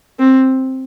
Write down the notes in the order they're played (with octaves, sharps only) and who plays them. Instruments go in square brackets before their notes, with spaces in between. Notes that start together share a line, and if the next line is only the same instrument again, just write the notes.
[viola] C4